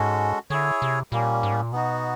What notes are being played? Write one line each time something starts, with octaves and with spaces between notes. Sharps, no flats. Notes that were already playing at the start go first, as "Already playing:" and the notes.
Already playing: G#2 G#3 C#4 F#4 A4
D3 E4 G#4 C#5
C3
A#2 G3 A#3 C#4
G#2
A2
A#2
B2 B3 D#4 F#4